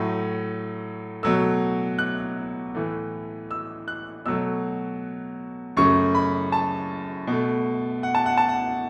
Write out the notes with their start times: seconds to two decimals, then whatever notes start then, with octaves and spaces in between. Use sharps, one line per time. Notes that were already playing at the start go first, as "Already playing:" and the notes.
Already playing: A2 F#3 A3
1.23 B2 F#3 A3 E6
1.99 F#6
2.75 A2 E3 A3
3.51 E6
3.88 F#6
4.26 B2 F#3 A3 E6
5.77 F#2 C#3 A3 C#6
6.15 B5
6.52 A5
7.28 B2 A3
8.03 F#5
8.15 A5
8.26 F#5
8.37 A5
8.49 F#5